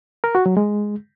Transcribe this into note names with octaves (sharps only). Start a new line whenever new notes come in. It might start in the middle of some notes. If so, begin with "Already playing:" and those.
A#4
F#4
F#3
G#3